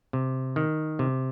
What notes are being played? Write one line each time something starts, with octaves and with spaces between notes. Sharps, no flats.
C3
D#3
C3